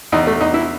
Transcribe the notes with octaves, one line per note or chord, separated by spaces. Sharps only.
E2 D#4
A3
E2 D#4
E4